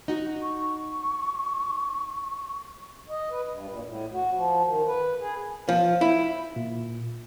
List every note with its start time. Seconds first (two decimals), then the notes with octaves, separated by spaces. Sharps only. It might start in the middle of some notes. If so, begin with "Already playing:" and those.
0.08 D#4 F#4
0.42 C#6
3.09 D#5
3.30 B4
3.48 G2
3.69 A#2
3.84 A2
4.13 F#4
4.34 F3
4.66 D#3
4.87 B4
5.20 G#4
5.69 F3
6.01 E4
6.56 A#2